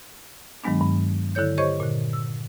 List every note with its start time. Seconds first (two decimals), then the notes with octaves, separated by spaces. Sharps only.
0.64 G2 D#3 F#3 G#3 B3 D4
0.80 G2
1.35 D3 E4 A4 C#5 G6
1.58 G4 C5 C#5 D#5 C#6 G#6
1.80 A#2 D3
2.13 E6